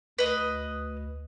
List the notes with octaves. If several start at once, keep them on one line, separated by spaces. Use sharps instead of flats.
D2 B4 D#5